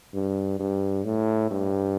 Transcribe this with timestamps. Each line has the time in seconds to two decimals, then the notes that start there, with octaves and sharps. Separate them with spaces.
0.13 G2
0.59 G2
1.05 A2
1.51 G2